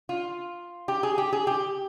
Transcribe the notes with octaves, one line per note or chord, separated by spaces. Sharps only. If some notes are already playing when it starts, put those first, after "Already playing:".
F4
G4
G#4
G4
G#4
G4